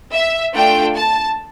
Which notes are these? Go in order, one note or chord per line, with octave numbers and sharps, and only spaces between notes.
E5
A3 D4 F4 A4 G5
A5